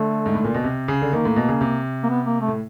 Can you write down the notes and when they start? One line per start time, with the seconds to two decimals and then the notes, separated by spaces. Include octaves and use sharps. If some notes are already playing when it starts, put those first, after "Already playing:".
Already playing: D3 A3
0.26 G#2
0.35 A2
0.44 A#2
0.54 B2
0.64 C3
0.88 C#3
1.02 D3
1.13 D#3 A#3
1.25 A2
1.36 B2
1.49 C#3
1.61 C3
2.03 A#3
2.10 B3
2.26 A#3
2.41 A3
2.48 A2